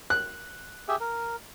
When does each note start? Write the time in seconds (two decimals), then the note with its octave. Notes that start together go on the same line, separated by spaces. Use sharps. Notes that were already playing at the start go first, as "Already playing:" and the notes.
0.10 F#6
0.88 G4 G#4 E5
1.00 A#4